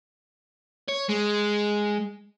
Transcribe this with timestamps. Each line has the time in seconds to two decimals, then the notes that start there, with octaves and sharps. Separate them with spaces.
0.88 C#5
1.09 G#3